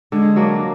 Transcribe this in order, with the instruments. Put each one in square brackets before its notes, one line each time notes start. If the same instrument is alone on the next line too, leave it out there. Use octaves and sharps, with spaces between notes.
[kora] D3 [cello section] G#3
[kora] F#3 A#3 D4